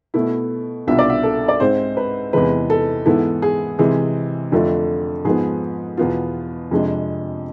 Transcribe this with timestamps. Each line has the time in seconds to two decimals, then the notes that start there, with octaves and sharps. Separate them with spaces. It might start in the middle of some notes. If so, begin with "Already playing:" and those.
0.14 B2 A3 E4
0.87 C2 B2 B3 D4 F4 E5
0.99 D5
1.10 E5
1.23 A4
1.48 D5
1.60 G#2 G#3 C4 C5
1.97 B4
2.33 E2 C3 E3 G#3 B4
2.70 A4
3.06 G#2 E3 B3 E4 A4
3.42 G#4
3.79 C3 E3 G#3 G#4
4.52 F2 D3 A3 D4 F4
5.25 G#2 F3 B3 G#4
5.97 E2 B2 B3 F4
6.71 F2 C3 G#3 D4